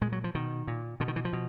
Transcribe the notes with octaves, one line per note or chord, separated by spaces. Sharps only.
A#2 G#3
F#3
F3
B2 D#3
A#2
B2 D3
D#3
E3
F3
B2